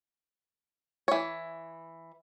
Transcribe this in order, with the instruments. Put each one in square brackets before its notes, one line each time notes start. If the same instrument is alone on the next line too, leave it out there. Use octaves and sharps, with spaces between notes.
[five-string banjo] E3 C#5